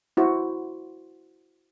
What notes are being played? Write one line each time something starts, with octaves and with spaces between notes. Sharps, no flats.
E4 F#4 C5